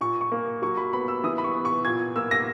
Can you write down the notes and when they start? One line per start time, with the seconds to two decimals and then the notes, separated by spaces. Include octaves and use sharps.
0.01 A#2 C#6
0.21 C#6
0.32 A#3
0.62 F#3 C#6
0.77 B5
0.93 B3 B5
1.08 E6
1.24 E3 D#6
1.38 B5
1.44 C#6
1.55 B3
1.65 C#6
1.85 A#2 G#6
2.16 A#3 E6
2.31 A#6